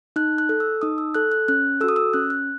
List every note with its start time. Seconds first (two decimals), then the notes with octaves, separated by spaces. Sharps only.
0.16 D#4 F#6
0.38 F#6
0.49 A4
0.60 E6
0.81 D#4 D#6
0.98 E6
1.15 A4 F#6
1.32 F#6
1.48 C#4 F#6
1.81 F#4 A4 E6
1.88 D#6
1.96 E6
2.14 C#4 F#6
2.30 F#6